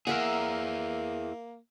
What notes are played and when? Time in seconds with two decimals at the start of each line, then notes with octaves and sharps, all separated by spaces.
0.07 A#3 E4 G#4 A#4 E5 F#5